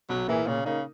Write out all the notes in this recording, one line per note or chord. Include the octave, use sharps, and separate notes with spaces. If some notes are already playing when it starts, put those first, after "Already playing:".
B1 F#3
A#2 E3 A#3 E4 G#4
A#2 C#3
C#3 A#3 D#4